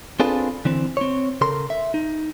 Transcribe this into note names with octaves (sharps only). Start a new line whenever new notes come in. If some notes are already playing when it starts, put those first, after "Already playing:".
C4 D4 F4 G#4 A4 B4
D3 E3 C4
C4 C#5
C#3 A4 A#4 C6
E5
D#4